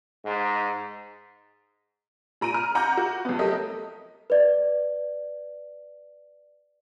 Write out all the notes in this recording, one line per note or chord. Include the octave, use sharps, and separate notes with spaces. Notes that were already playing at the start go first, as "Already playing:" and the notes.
G#2
A#2 A#5 D7 D#7
A#5 F6
F#5 A#5 D6 G6
F#4
F2 B3
F#3 A3 G4 A#4 D#5
B4 D5